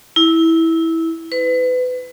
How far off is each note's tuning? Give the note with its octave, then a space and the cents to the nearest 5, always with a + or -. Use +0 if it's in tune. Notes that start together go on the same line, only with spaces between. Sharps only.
E4 -15
B4 +30